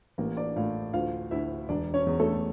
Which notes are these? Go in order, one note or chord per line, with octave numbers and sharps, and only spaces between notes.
A1 A#3 A#4
D4 D5
A2 F4 F5
D2 F4 F5
D2 E4 E5
E1 D4 D5
C#4 C#5
E2
A3 A4